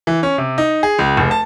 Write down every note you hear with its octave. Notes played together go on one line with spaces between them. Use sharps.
E3
C#4
C3
D#4
G#4
C#2
F1
A5